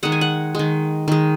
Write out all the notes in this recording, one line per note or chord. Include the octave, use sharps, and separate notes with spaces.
D#3 G#3 F#5
G#5
F#5
D#3 G#3
D#3 G#3